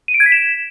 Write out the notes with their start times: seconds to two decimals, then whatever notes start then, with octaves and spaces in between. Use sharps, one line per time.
0.08 D#7
0.14 D7
0.20 G#6
0.26 B6
0.32 E7